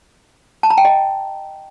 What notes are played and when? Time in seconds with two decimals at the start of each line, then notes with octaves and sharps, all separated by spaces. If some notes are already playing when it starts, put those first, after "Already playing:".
0.63 A5
0.70 A#5
0.78 G5
0.85 D#5